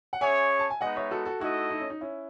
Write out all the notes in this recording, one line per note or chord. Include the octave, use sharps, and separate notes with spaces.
F#5
C#4 G#4 C#5 E5 G#5
A5
G#5
G#3 B3 D#4 D#5 F#5
C#5 E5
F#4 A4
F#4 A4
A3 D#4 E4 F#4 A4 D#5
D#4
C#4
D#4
C#4 E4